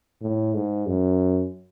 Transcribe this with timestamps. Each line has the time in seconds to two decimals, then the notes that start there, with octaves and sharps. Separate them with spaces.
0.22 A2
0.54 G#2
0.87 F#2